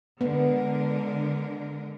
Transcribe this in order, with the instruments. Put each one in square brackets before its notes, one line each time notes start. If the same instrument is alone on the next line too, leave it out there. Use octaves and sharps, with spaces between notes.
[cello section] D3 G#3 A#4 [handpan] B3